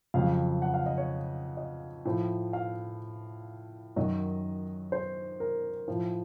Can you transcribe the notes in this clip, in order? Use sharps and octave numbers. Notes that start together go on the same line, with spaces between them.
F2 C#3 F#3 F5
F#5
F5
D#5
C#5
D#5
A2 F3
F5
F#2 D#3 F#3 D#5
C5
A#4
A2 F3